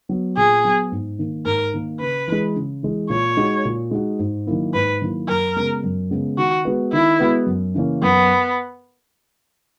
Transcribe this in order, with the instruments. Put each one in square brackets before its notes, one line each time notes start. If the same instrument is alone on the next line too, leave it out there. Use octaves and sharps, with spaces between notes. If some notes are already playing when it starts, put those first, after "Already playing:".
[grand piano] F#3 B3
[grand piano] A#2 [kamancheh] G#4
[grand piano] F#3 B3
G#2
D#3 A#3
[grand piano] G#2 [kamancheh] A#4
[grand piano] D#3 A#3
[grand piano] C#3 [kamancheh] B4
[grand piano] E3 G#3
C#3
E3 G#3
[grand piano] A#2 [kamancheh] C#5
[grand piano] G#3 D#4 F#4
A#2
G#3 D#4 F#4
G#2
D#3 F#3 A#3 E4
[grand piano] G#2 [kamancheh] B4
[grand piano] D#3 F#3 A#3 E4
[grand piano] F#2 [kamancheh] A#4
[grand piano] C#3 G#3 B3
F#2
C#3 G#3 B3
[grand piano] D#3 [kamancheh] F#4
[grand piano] G#3 B3 F#4 B4
[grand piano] D#3 [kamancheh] E4
[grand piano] G#3 B3 F#4 B4
F#2
C#3 E3 A#3 C#4
[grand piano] F#2 [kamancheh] B3